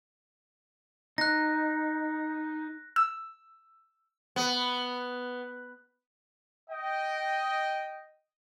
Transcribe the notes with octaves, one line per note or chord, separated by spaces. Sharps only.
D#4 F#6 A#6
E6
B3
D#5 G5